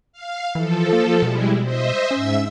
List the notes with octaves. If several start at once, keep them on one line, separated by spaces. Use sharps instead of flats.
F5
E3 F3 A4
A#3
B2 G3 G#3 E4
C5 D#5 E5
G#2 C#4 E5 E6